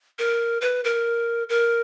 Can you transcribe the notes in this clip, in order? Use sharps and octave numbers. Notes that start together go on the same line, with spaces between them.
A#4
B4
A#4
A#4